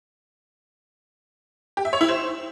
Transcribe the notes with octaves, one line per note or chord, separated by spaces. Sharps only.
G4
E5
C#5
E4
C5